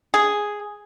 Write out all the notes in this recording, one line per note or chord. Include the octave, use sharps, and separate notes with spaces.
G#4